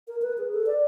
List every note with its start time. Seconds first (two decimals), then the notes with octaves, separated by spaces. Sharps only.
0.08 A#4
0.22 B4
0.38 G#4
0.53 A4
0.67 D5